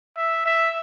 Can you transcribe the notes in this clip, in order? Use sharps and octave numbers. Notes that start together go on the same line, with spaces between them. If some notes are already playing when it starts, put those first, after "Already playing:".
E5
E5